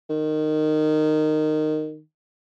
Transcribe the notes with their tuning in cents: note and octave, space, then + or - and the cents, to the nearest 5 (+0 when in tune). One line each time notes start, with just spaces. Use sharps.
D#3 -15